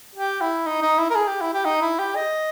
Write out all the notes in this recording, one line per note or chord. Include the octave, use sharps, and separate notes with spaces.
G4
E4
D#4
D#4
E4
A#4
G#4
G4
E4
G4
D#4
E4
G4
D#5